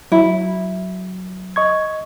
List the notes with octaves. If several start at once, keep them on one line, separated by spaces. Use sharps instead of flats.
F#3 E4
D#5 C#6 G#6